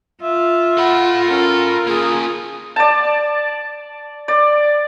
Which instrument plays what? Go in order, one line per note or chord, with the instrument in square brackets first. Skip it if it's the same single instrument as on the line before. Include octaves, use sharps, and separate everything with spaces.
[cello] F4 [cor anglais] E5
[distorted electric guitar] A4 B5 [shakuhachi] F#5
[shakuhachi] C#4 [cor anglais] A#4
[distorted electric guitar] A#3 C#4 [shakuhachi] G#4
[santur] D5 A5
D5